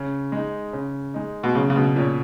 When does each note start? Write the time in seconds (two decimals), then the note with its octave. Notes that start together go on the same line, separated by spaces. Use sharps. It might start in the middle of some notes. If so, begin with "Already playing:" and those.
Already playing: C#3
0.32 G#3 D#4
0.73 C#3
1.14 G#3 D#4
1.43 B2
1.55 C#3 F#3
1.70 C#3
1.76 B2
1.96 A#2 A#3 C#4 F#4 C#5